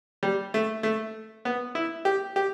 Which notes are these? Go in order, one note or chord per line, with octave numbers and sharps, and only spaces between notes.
G3
A3
A3
B3
E4
G4
G4